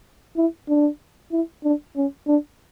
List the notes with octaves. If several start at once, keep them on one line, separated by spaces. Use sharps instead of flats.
E4
D4
E4
D4
C#4
D4